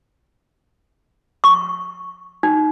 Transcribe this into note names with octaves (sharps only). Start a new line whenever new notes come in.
C#6
D#4